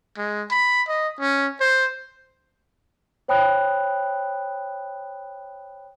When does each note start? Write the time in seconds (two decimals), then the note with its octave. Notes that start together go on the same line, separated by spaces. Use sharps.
0.18 G#3
0.51 B5
0.88 D#5
1.20 C#4
1.60 C5
3.28 C5 C#5 G5 B5 D#6 F#6